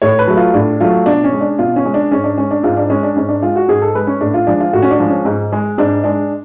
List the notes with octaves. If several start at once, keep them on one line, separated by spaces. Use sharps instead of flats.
A2 C#5
B4
F#3 A3
F4
A2 D4
F#3 A3 F4
B2 D4
C#4
G#3
D4
B2 F4
C#4
G#3
D4
G#2 C#4
D4
G#3 C#4
D4
G#2 F4
D4
G#3 C#4
D4
G#2 C#4
D4
G#3 F4
F#4
G#2 G#4
A4
G#3 B4
C#4
A2 D4
F4
F3 G#3 D4
F4
A2 F#4
C#4
D4
F3 G#3
C#4
G#2
G#3
G#2 D4
G#3 D4